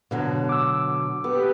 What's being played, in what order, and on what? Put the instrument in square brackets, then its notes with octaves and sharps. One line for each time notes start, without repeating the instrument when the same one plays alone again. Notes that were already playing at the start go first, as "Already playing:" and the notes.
[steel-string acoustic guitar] B2 D3 F#3
[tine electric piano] D6 E6
[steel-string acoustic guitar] B3 [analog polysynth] G4 A4 B4